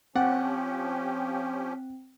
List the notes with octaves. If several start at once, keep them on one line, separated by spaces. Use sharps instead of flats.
F3 C4 C#4 G4 F#5